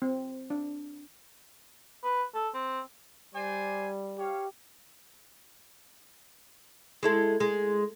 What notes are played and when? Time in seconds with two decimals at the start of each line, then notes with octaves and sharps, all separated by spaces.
0.02 C4
0.50 D4
2.04 B4
2.34 A4
2.54 C4
3.34 G3 C5 D5 G#5
4.18 G4 C#5 F5
7.03 G#3 E4 A4
7.40 G#3